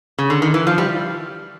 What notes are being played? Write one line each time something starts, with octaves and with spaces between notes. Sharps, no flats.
C#3
D3
D#3
E3
F3
G3